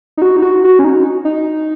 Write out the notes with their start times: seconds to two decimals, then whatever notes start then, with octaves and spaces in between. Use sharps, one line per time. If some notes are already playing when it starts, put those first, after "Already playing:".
0.17 D#4
0.22 F#4
0.36 D#4
0.42 F#4
0.64 F#4
0.79 C#4
0.84 D#4
1.25 D#4